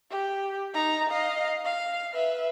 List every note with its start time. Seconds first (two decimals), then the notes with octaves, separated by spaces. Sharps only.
0.11 G4
0.74 D#4 A#5
1.09 D#5 F5
1.65 F5
2.14 B4 E5